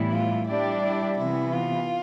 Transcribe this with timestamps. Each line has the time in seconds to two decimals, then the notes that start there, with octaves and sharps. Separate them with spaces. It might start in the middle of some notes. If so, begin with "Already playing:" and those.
Already playing: A2 E3 G3 B3 E4
0.13 F4
0.47 G3 D4 E4 G4 D5
0.83 E4
1.17 C3 E3 B3 E4
1.53 F4